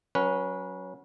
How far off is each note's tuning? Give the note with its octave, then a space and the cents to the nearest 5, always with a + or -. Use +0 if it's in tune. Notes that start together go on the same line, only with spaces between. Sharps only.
F#3 +0 C#4 +0 B4 -25